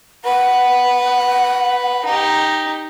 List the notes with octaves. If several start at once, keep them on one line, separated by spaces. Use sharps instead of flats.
B4 F#5
D#4 G4